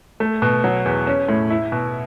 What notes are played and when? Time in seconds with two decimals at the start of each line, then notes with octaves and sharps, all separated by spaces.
0.20 A3
0.42 B2
0.64 F#3
0.85 E2
1.07 C#4
1.28 A2
1.50 E4
1.72 B2